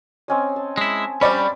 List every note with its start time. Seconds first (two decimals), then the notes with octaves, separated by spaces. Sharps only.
0.28 C4 C#4 D#5
0.56 A5
0.78 G#3 E4
1.21 G3 C#4 C5 D5 B5